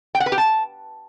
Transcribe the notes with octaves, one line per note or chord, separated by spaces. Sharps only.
G5
F#5
B4
G4
A5